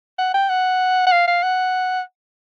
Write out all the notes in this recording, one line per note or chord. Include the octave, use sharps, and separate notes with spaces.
F#5
G5
F#5
F#5
F5
F5
F#5